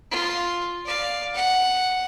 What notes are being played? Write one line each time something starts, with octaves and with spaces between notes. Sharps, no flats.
F4
D5 F5
F#5